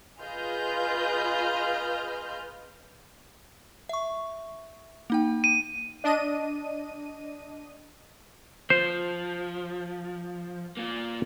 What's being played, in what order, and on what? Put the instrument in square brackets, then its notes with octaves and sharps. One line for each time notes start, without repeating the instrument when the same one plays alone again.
[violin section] F4 G#4 B4 D#5 F6 G6
[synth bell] E5 C#6
A#3 D#4 G5
[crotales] D#7
[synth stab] D4 D#5 D#7
[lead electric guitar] F3 [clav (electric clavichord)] C5
[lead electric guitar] A#3 F4